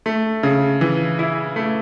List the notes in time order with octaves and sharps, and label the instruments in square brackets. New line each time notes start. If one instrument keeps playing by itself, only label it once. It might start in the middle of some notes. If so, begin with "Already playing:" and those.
[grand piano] A3
C#3
E3
E4
A3